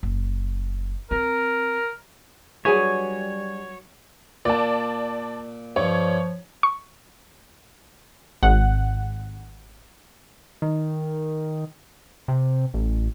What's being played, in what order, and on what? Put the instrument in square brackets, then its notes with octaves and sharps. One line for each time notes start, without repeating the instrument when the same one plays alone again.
[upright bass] F#1
[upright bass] C4 [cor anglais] A#4
[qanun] F#3 B4 [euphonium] G3 [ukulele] D4 G#4 G#5 [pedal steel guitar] C#5
[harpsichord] A#2 [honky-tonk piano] D5 A5
[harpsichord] G2 [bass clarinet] F3 [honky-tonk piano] C#5
[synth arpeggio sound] C#6
[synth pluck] G#1 F#5
[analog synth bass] D#3
C3
A1